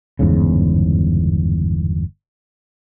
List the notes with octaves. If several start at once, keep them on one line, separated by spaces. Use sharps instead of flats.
G1 E2 G#2 C#3